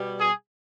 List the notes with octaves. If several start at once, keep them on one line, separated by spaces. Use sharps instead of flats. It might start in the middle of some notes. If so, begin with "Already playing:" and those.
Already playing: B2 G3
G#4